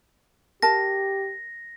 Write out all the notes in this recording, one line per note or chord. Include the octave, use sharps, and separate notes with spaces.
G4 A#4 A5 A#6